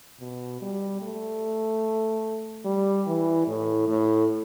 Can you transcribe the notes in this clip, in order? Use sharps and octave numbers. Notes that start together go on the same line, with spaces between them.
B2
G3
A3
G3
E3
A2
A2